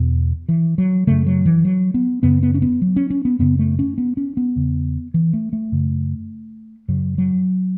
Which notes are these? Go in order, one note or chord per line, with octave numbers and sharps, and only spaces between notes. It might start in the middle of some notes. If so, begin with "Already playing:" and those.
Already playing: E2 B2
E3
F#3
F#2 C#3 A3
F#3
E3
F#3
B3
F#2 C#3 B3
B3
C#4
B3
F#3
C#4
C#4
B3
F#2 C#3 B3
A3
C#4
B3
C#4
B3
E2 C#3
E3
A3
A3
F#2 C#3
F#2 C#3 F#3
F#3